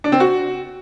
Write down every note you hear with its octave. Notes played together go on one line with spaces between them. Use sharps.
D4
C4
F#4